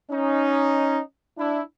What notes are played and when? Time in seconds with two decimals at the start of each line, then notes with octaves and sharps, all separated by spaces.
0.11 C#4 D#4
1.38 D4 E4